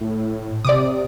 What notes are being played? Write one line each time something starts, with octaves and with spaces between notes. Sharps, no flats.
A2
C3 D5 D6 D#6